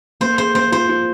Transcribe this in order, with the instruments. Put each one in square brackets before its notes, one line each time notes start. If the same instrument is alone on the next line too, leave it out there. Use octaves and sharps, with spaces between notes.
[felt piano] A#3 [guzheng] C5
[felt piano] G#4 [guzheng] C5
[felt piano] A#3 [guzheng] C5
[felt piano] F4 [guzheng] C5
[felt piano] F4